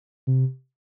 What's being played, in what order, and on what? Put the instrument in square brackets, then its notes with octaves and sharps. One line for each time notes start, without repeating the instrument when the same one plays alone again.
[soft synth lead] C3